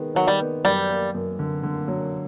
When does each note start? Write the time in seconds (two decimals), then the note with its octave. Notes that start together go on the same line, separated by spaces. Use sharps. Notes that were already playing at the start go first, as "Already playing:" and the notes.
Already playing: D#3 G#3 B3
0.15 D#3 F#3
0.28 G3
0.40 B3
0.65 F#2 G3
0.89 A#3
1.15 F#2
1.39 D3
1.63 D3
1.88 F#3